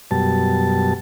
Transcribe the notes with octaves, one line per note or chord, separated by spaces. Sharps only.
F#2 B2 G3 A5